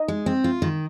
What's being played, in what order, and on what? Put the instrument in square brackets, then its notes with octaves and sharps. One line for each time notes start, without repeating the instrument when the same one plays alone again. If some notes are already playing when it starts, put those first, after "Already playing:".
Already playing: [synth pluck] D#4 D#5
[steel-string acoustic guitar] G#3
C4
F4
D#3